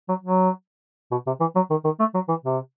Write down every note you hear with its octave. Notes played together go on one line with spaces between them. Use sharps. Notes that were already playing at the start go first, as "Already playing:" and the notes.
F#3
F#3
B2
C3
E3
F#3
D#3
D#3
A3
F#3
E3
C3